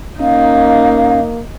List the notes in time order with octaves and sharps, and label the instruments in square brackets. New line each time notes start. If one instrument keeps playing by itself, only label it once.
[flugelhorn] A#3 [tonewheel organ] C#4 [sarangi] D#4 [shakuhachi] F5